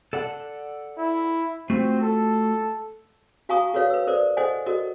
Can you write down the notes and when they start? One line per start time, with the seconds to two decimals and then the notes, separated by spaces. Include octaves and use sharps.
0.13 A4 D5 F#5
0.98 E4
1.70 A3 C4 F4 F#4
2.01 A4
3.49 F#4 F5 G#5 A#5 C#6 D#6
3.74 F#4 A4 B4 C#5 F5
3.90 B4 E6
4.07 A4 A#4 C5 D5
4.37 A4 C5 D#5 F#5 G#5
4.66 F#4 A4 A#4 D#5